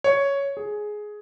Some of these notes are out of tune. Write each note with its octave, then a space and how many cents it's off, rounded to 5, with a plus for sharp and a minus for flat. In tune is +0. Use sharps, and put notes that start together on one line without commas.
C#5 +5
G#4 +10